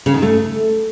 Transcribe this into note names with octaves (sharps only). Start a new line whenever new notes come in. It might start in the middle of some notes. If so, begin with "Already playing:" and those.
C#3
D#3
A3